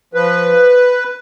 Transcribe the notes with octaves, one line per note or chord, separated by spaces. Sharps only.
F3 B4